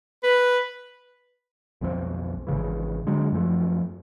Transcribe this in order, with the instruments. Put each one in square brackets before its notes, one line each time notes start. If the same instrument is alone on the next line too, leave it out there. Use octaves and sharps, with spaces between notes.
[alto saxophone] B4
[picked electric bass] B1 F2 F3 C4
G#1 D2 C#3 E3
D3 F#3 G#3
F#2 F3 A3